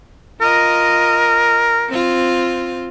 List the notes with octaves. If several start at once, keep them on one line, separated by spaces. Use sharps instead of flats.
F4 A#4 D#5
C4 F4